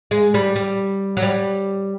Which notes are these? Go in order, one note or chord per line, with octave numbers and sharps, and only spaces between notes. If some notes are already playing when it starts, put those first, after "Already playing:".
G#3
G3
G3
F#3
G3